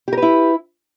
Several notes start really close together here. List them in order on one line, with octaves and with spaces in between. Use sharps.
G4 A#4 B4 E4